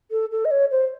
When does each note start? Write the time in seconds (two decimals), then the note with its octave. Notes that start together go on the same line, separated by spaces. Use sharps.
0.11 A4
0.31 A4
0.45 D#5
0.51 C#5
0.71 C5